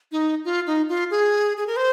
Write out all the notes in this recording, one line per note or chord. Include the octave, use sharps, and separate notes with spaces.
D#4
F4
D#4
F4
G#4
G#4
A#4
C5